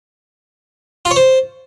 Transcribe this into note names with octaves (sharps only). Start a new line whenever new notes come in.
F4
C#5
C5